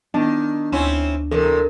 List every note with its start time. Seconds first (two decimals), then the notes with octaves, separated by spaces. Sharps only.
0.14 D#3 B3 D4
0.72 D2 C4 C#4 E4
1.31 E2 C3 A4 A#4